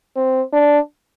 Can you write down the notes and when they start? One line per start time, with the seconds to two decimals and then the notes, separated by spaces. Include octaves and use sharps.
0.16 C4
0.53 D4